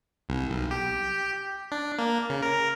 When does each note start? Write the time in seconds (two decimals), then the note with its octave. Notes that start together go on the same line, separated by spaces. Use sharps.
0.29 C2
0.50 B1
0.71 G4
1.72 D4
1.98 A#3
2.30 C#3
2.43 A#4